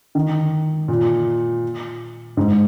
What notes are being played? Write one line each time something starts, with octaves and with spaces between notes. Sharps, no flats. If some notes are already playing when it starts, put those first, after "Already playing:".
D#3
A#2
G#2